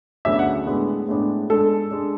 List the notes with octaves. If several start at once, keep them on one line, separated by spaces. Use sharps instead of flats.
D2 C#3 F#3 B3 D4 E5
F#5
A2 G#3 B3 D4
A2 G#3 B3 D4
G#2 G#3 D4 A4
G#3 D4